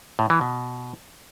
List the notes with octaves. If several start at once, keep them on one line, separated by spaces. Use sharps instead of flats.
A2
E3
B2